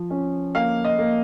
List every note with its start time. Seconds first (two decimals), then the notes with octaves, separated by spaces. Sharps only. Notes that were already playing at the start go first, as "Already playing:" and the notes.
Already playing: F3
0.10 C#4
0.55 A#3 F5
0.85 D#5
0.99 A#3